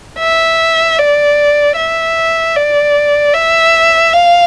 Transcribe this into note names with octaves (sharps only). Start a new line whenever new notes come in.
E5
D5
E5
D5
E5
F5